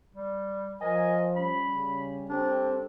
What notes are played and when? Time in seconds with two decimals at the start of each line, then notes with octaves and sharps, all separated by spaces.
0.15 G3
0.81 F3 A#4 C5 D#5 G#5
1.36 G3 C#4 B5
1.74 C#3
2.30 G3 C4 D4 G4 A4